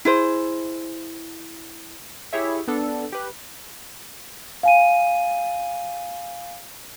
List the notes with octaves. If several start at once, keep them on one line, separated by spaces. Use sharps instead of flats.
E4 G#4 C5
E4 G4 G#4 C#5 E5
B3 D4 A4
G4 B4
F5 G#5 D#7